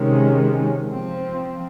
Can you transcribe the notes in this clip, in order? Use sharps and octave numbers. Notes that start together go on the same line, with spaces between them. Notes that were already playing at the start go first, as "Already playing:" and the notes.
Already playing: C3 D#3 G#3 C#4
F3 C4